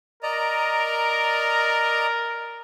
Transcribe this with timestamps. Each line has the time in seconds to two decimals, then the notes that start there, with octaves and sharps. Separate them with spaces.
0.23 A#4 D5 D#5 A#5